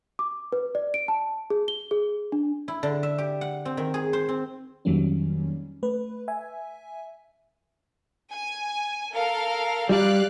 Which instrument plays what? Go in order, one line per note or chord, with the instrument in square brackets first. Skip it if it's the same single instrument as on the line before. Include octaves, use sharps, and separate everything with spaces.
[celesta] D6
B4
D5
D7
A5
G#4
G7
G#4
D4
[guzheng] E4
D3
E5
G4
F#5
C4
D#3
G#4
C5
C4
[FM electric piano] F2 D#3 F#3 G3 A#3 C#4
A3 B4
E5 G#5
[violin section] G#5
A4 A#4 F5
[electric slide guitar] G3 [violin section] D5 F5 F#6